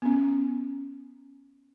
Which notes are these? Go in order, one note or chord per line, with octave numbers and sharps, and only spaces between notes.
B3 C#4